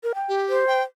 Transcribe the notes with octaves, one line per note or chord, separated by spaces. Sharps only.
A#4
G5
G4
C5
G5